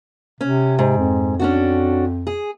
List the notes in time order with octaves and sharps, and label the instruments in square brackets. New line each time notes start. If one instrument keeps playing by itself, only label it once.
[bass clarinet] C3 [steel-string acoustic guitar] C#4
[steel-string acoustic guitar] G#2
[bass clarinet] F2
[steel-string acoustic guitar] C#4 D4 F#4
G#4